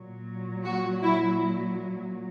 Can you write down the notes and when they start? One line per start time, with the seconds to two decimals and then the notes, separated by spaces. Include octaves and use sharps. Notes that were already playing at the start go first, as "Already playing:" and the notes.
Already playing: A#2 F#3
0.65 F#4
1.03 E4